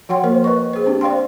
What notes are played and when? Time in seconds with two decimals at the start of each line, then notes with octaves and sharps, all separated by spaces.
0.09 F3 F#4 C#5 F#5 G5 C6
0.24 F3 A#3 A#4 C5
0.44 B4 D#5 C#6
0.73 G#4 C5
0.86 C4 D4 G4
1.01 C5 D5 F5 G5 C6